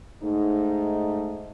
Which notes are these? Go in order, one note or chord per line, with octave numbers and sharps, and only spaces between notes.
G#2 A3 D#4